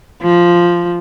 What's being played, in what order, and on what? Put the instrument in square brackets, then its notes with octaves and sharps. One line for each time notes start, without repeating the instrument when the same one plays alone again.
[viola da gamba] F3